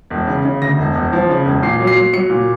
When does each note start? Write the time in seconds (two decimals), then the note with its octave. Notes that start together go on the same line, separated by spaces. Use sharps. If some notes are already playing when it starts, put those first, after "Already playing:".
0.10 E1
0.27 C#3
0.45 C#3
0.62 D2 A#6
0.78 E1
0.95 E1
1.13 F3
1.29 C#3
1.45 E1
1.63 A#2 C7
1.80 F#3
1.87 C7
1.96 F#3
2.13 F#3 C#7
2.30 A#2